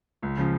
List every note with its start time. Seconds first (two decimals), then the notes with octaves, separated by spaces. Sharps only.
0.22 C#2
0.37 C#3 F3